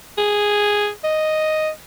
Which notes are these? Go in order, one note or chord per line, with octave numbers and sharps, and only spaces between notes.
G#4
D#5